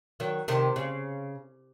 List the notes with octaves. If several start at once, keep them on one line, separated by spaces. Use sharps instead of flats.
D#3 F#3
C3 D#3
C#3